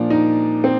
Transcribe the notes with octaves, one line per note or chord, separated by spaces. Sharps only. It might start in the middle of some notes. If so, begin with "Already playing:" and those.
Already playing: A#2 F3 D4
D#4
C4